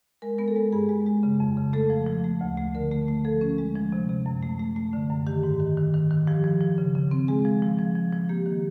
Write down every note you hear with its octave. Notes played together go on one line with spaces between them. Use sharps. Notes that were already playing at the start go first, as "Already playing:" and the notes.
G#3 A#4
B3 A#4
A4
G#3
G2 G#4
G#3
G#3
C#3
F2
C#3
A3 A4
F3
F3
A3
D2
A3
D3 A#4
A3
A3
F3 A4
C#4
G#3
F3
C3
C3
F#2
A3
A3
A3
D3
F#2
D#3 G4
G#2
D#3
D#3
D#3
D#3
F3 G4
F3
F3
C#3
C#3
C4
G#3 G#4
F3
F3
F3
F3
F3
A#3 G4
D#3